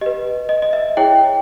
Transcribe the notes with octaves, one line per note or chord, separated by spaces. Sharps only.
G4 B4 D#5
D#5
D#5
E5
E4 G#4 C#5 G5